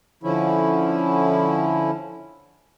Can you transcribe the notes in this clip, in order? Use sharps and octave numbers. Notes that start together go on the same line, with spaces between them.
D3 F3 C#4 E4